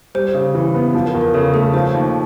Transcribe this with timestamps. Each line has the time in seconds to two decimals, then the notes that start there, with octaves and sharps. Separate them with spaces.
0.15 G3 C5
0.34 C#3
0.55 E3
0.74 B3
0.94 F3
1.07 A#4
1.14 E2
1.21 A#4
1.34 C#3 A4
1.54 A3 G#4
1.74 F3 C5
1.94 D#2